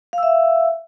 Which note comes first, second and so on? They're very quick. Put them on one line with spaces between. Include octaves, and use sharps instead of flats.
F5 E6 E5